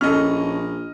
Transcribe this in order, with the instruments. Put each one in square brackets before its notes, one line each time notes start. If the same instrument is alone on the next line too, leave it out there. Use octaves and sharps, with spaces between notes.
[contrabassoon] A#1 [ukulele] C#4 E4 A4 [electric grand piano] D#5 F6